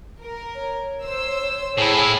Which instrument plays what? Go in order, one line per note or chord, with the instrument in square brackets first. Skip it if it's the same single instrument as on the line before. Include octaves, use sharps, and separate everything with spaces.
[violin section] A#4
[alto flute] C#5
[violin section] C5 E6
[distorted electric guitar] A2 E4 [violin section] G#4